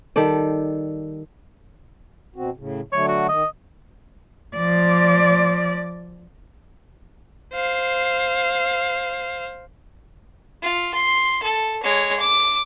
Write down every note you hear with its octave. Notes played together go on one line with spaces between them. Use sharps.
D#3 G3 A4 D5
B2 C4 F#4
A2 C#3
D3 F#3 A3 C#5
F#4
D#3 D#5
F3 D5
C5 F5
F4
C6
A4
G#3 C#5
D6